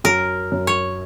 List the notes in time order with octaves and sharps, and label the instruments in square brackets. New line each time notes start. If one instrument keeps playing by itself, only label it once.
[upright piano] F#2 [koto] A#4
[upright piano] F#2
[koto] C#5